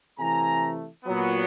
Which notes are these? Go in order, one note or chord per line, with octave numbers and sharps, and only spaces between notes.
C3 E3 A3 G#5 A#5
A#2 F#3 B3